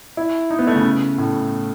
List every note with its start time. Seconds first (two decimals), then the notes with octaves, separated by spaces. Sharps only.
0.17 E4
0.51 D#4
0.59 B3
0.67 A3
0.75 C#3
1.18 A2